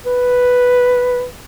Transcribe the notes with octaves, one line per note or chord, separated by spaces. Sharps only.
B4